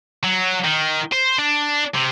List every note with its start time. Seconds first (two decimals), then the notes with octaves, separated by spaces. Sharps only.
0.23 F#3
0.64 D#3
1.12 C5
1.39 D4
1.95 C3